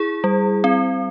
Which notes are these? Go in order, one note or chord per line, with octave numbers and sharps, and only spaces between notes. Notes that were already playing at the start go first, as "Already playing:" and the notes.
Already playing: E4 G#4
G3
C4